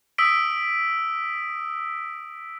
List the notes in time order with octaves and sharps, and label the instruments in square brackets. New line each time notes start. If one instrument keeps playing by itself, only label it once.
[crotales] D#6 E6 B6 D7